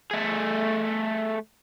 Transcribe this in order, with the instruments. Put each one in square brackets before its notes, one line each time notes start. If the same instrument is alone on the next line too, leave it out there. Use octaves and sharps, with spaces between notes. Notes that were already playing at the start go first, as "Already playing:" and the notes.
[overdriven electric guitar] A3 G#4